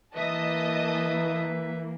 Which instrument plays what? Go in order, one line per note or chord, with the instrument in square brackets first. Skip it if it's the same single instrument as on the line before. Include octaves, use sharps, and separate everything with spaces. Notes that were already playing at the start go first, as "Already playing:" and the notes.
[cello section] E3 A#3 [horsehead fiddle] B4 E5 [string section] D#5 A5 D#6